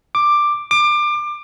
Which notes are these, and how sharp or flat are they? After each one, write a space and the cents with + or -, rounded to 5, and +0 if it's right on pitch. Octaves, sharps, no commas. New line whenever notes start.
D6 +10
D6 +25